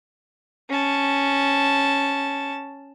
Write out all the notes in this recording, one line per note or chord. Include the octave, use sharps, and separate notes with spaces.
C#4 A5